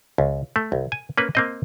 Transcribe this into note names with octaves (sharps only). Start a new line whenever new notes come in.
C#2
A3
C2
G#5
A#3 C#4 B4
A#3 C4 D#5